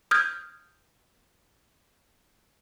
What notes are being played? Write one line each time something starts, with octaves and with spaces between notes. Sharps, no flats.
D#6 F6 G6 G#6